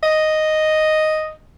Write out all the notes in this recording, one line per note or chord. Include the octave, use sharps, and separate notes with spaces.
D#5